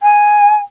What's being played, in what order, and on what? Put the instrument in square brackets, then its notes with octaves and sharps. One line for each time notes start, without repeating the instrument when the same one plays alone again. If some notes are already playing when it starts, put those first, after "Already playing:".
[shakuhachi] G#5